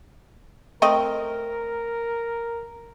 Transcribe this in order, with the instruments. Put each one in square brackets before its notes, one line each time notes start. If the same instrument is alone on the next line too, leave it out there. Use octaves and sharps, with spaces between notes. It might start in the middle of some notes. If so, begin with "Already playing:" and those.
[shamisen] A3 C4 D#5 [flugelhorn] A#4